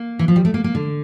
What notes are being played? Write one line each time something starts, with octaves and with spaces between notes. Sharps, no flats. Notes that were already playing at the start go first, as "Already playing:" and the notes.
Already playing: A#3
E3
F3
G3
A3
A#3
A#3
D3